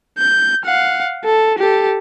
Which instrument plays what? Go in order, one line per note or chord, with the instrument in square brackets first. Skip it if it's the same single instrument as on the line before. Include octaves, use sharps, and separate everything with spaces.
[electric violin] G6
F5 F#5
A4
G4 A4